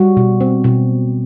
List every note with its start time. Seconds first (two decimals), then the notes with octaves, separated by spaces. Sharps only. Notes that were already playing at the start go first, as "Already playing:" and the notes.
Already playing: G3 F#4
0.17 B2
0.41 C4
0.64 B2